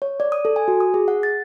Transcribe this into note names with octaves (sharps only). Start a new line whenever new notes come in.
C#5
D5
D#6
A4
G#5
F#4
D#6
G#4
F#5
A6